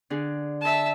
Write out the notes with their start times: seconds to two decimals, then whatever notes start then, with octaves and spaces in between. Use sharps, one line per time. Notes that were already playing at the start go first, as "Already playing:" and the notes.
0.10 D3 D4 G#4
0.61 E5 A5